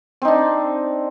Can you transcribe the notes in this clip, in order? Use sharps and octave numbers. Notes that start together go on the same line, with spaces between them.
C4 D4 D#4